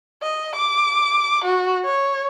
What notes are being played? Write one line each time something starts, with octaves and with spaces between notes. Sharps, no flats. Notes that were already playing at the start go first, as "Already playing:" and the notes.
D#5
D6
F#4
C#5